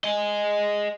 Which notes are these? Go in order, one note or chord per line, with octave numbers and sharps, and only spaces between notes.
G#4 D#5